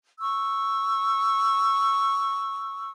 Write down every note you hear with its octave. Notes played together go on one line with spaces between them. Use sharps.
C#6 E6